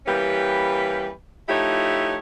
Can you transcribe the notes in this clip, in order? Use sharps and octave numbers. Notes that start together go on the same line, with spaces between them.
E3 G3 A#3 C#4 G4 B4
F3 A3 D#4 E4 G4 C#5